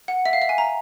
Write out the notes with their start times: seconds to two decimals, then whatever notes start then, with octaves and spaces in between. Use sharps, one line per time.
0.08 F#5
0.26 E5
0.33 F5
0.42 E5
0.49 G#5
0.58 A#5